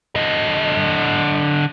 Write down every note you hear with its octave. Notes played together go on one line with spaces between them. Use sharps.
D3 D#5